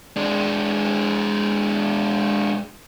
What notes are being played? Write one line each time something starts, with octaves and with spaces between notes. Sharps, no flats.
G#3 D4